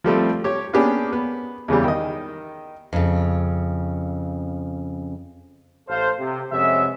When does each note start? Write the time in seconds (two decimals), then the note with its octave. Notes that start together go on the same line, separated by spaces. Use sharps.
0.04 F3 G3 A3 C4
0.44 G4 C#5
0.73 A#3 B3 C#4 D4 G4 G#4
1.13 B3
1.68 E2 C#3 E3 G3
1.84 D#3 D#5
2.93 F2 C#3
5.89 A1 A4 C5 F5
6.19 C3
6.52 F2 C3 G#3 B3 C#4 E5